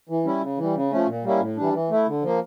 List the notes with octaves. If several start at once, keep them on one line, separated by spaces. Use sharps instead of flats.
E3
G3 C#4 E4
C#3
E3 G3
C#3
F3 A3 C#4
A#2
G3 A#3 C#4 E4
A2
E3 G3 D4
E3
A3 E4
D3
F3 A#3